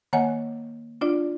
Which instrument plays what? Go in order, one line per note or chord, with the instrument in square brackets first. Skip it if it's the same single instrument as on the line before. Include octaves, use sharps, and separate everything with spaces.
[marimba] D#3 A#3 C#5 F#5 G#5
D4 F4 D5